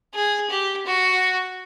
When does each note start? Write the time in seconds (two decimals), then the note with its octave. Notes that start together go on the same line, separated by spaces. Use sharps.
0.14 G#4
0.50 G4
0.86 F#4